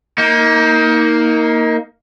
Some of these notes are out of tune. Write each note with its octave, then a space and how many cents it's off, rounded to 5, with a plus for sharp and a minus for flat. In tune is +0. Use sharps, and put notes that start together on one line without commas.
A#3 +0 D#4 +25